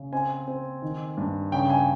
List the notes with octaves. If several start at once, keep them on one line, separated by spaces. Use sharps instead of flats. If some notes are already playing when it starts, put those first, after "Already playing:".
Already playing: C#3
C4 G#5
C4
D#3
G2
C#3 G5
G#5